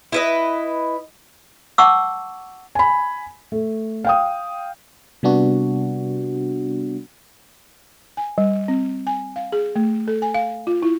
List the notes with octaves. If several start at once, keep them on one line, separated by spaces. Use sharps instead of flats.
E4 B4 D#5
F#5 A5 C#6 D6 E6
G#5 B5
A3
F5 G5 D#6
C3 G3 B3 D4 F#4
G#5
G3
C4
G#5
F5
G#4
A3
A4
G#5
F5
F4
E4